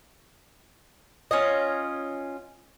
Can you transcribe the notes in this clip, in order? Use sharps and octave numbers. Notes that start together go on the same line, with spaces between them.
C#4 F4 D#5